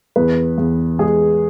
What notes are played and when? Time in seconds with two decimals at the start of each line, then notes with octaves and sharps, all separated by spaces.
0.16 E2 B4
0.58 E2
0.99 G#3 G#4